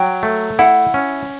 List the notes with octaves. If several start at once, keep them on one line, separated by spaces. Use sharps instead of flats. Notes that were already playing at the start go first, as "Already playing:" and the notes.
Already playing: F#3 G5
A3
E4 F#5
C#4